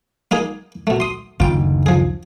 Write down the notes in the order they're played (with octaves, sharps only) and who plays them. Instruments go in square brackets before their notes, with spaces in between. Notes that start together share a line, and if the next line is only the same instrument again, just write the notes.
[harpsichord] A#3 D#4 G#4
B2 A3
C6 D#6
[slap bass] F#1 D2 D#3 [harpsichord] F4 G5
[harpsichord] F3 G#4